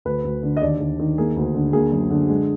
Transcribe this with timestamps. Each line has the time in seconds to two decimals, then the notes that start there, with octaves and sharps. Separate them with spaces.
0.05 D2 B4
0.24 D2
0.43 D3
0.57 D#5
0.61 D#2 D5
0.80 D#2
0.99 D#3
1.18 A#3 G#4
1.36 D2
1.55 D3
1.73 A#3 G#4
1.92 F#2
2.11 D3
2.28 G#3